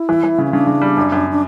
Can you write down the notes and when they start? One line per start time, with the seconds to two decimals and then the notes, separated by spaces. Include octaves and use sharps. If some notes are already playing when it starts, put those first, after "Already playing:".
Already playing: E4
0.09 E3
0.24 E3
0.38 C#3
0.44 C#4
0.53 C#3 D4
0.67 C#3
0.81 G3
0.97 F#2
1.12 F#2
1.31 D4